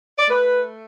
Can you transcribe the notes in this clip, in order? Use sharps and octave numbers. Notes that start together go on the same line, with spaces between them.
D5
A3 B4